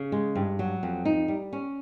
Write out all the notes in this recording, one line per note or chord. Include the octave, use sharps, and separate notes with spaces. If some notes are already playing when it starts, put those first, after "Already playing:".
Already playing: C#3
G#3
G2
F#3
F2
D#4
G3
C#4